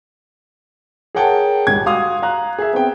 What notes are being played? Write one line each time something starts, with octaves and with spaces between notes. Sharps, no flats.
G#4 A#4 C#5 F#5 G5 A5
D#1 C#2 G#6
F#4 F5 C6 D#6
F5 A#5 F#6
G#4 E5
B3 C4 G5